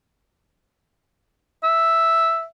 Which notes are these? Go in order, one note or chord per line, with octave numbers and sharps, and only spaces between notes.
E5